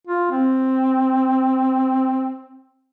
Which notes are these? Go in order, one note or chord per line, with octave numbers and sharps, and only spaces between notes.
F4
C4